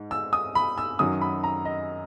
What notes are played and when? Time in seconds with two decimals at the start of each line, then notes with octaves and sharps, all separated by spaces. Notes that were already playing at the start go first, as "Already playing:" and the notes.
Already playing: G#2
0.11 E6
0.33 D#6
0.55 B5
0.78 E6
0.99 F#2 D#3 F#3 D#6
1.21 B5
1.44 A#5
1.65 D#5